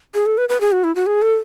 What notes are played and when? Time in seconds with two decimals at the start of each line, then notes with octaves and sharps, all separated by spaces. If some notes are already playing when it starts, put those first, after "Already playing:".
0.14 G#4
0.26 A4
0.38 B4
0.49 B4
0.61 G#4
0.72 F#4
0.84 E4
0.95 F#4
1.06 G#4
1.22 A4